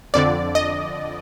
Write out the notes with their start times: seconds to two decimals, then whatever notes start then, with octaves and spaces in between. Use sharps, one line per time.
0.14 F2 D3 D5
0.55 D#5